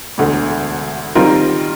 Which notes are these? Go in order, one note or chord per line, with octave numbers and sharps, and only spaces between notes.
E1 D2 D3
D#3 G3 C4 F4 A#4